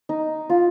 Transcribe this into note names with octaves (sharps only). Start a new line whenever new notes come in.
D#4
F4